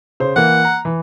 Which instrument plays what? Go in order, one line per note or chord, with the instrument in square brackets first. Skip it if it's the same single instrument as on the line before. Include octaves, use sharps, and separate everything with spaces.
[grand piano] C#3 C5
[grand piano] E3 A#3 [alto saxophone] F#5
[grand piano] A#5
E3